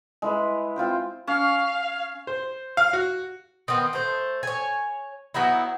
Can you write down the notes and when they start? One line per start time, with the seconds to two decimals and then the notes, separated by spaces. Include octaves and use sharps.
0.22 G#3 E4 B4
0.76 C4 F4 C5 G5
1.27 C#4 F5
2.27 C5
2.77 F5
2.93 F#4
3.68 D#3 B3 C4
3.93 A3 C5
4.43 C#5 G#5
5.34 F#3 B3 D#4 E4